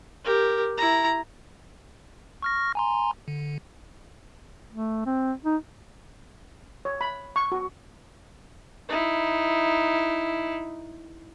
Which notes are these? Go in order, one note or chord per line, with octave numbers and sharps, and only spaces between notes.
G4 A#4
E4 A#5
C#6 F6 A#6
G#5 A#5 C6
D3
A3
C4
D#4
C#5
B5
C#6
F#4
D#4 E4